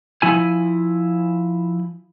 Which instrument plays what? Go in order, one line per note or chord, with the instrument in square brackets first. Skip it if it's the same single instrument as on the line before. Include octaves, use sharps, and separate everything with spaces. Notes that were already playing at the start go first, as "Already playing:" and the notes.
[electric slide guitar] F3 E4 G#5